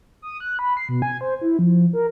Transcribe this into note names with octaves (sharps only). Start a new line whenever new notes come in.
D#6
F#6
B5
C7
B2
G#5
C5
E4
F3
A#4